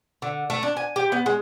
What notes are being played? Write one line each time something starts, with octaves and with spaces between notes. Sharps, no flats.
D3
A3
D4
G#5
G4
B3
G#3